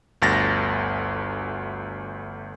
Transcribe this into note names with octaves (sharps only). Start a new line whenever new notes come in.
G1 D2 A6 A#6